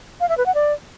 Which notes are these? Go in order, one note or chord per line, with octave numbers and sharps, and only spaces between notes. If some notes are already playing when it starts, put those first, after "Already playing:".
F5
E5
B4
F#5
D5